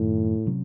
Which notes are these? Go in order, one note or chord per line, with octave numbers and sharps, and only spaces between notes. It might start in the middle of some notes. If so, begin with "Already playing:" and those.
Already playing: F#2 A2 D#3 A3
C3 F#3 C#4